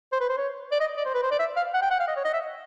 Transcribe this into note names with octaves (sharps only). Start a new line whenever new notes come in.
C5
B4
C5
C#5
D5
D#5
D5
C5
B4
C5
D5
E5
F5
F#5
G5
F#5
F5
D#5
C#5
D#5
E5